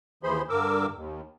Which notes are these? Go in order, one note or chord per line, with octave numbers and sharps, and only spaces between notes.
D#2 E3 G#4 C5 B5 C6
G2 D3 A#4 D6 E6
D#2